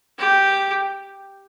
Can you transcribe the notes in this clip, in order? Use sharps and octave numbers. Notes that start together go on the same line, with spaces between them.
G4